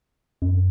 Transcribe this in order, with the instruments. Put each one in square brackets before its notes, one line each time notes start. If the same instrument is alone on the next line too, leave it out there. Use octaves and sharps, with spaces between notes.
[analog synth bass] F#2